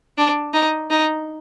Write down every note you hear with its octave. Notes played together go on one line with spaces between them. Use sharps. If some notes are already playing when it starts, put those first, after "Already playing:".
D4
D#4
D#4